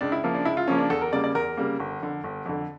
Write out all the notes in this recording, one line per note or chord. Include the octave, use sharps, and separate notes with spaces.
C#2 D4
E4
C#3 F3 A#3
D4
C#2 E4
F4
C#3 F3 A#3 C#4
D4
E2 A4
A#4
C#3 G3 A#3 D5
D5
E2 A#4
C#3 G3 A#3
G1
F2 D3
G1
F2 D3